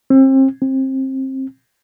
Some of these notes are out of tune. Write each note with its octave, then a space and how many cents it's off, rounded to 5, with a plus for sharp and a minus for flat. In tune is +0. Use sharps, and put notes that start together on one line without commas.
C4 +35
C4 +25